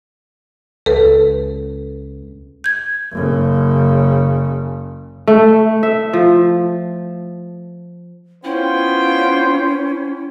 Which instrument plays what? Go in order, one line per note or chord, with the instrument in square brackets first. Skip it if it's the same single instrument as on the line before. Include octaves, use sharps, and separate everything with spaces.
[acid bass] C#2 [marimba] A4 B4
[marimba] G6 G#6
[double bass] F#1 C#3
[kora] A3
E5
F3
[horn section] B3 F4 G5 [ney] C#4 [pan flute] E4 [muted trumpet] C5